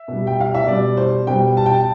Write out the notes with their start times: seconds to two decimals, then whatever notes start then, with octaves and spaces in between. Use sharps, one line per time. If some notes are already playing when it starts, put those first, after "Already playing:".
Already playing: E5
0.08 B2 G3
0.27 G5
0.41 F5
0.55 E5
0.67 B2 G3 D5
0.97 C5
1.27 B2 G3 G5
1.57 A5
1.66 G5
1.73 A5